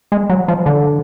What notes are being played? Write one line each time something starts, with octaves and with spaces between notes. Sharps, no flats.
G#3
F#3
F3
D3